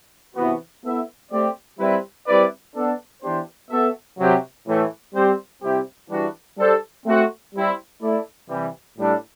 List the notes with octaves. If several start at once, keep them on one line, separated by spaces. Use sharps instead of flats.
C3 E3 B3 F#4
B3 E4 A4 E5
A3 C4 G4 D5
G3 C4 E4 B4
G3 C4 E4 B4 D5
B3 D4 A4
E3 B3 D4 G4 C5
B3 F#4 A4 E5
C3 F#3 C4 G4
A2 E3 A3
G3 C4 G4 C5
C3 G3 C4 E4 G4
E3 G3 D4 F#4
G3 D4 A4 C5
A3 C4 F#4
G3 C4 E4
A3 E4 A4 D5
C3 E3 G3
A2 G3 D4 A4